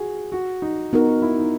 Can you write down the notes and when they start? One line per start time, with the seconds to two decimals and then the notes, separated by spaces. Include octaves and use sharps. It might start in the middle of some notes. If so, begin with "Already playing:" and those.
Already playing: F#4 G#4
0.32 F#4
0.62 D#4
0.93 B3 D#4 F#4 A#4
1.08 F#4
1.22 E4
1.37 D#4